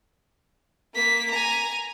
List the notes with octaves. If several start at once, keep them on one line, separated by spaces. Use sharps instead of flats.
A#3 B6
G#5 A#5